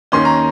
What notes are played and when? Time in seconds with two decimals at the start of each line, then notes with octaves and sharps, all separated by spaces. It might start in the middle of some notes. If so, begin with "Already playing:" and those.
0.12 D#2 D#3 A#3 C#4 C6
0.25 A#5